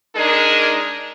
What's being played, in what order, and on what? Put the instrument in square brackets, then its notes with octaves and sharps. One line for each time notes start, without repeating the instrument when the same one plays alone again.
[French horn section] G#3 D4 D#4 G#4 A#4